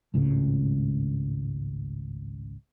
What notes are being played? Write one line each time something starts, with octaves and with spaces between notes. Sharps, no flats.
G#1 C#2 A2 C#3